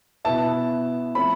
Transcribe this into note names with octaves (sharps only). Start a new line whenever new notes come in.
B2 B3 E4 A5
F3 A3 C4 B5